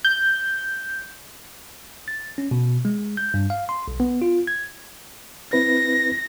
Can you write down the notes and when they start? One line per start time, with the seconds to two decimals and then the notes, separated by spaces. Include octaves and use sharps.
0.05 G6
2.08 A6
2.38 C#4
2.51 B2
2.85 G#3
3.17 G6
3.34 G2
3.50 F5
3.69 C6
3.88 B1
4.00 B3
4.22 F4
4.47 G#6
5.53 C4 E4 B4 A#6